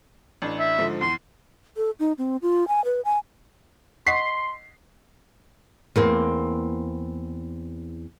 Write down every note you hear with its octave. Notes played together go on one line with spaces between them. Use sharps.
A1 D4
E5
G#2 D3 F3
E2 C6
A4
D#4
C4
F4
G#5
B4
G#5
D#5 F#5 C6 C#6 B6 C7
E2 A#3 C4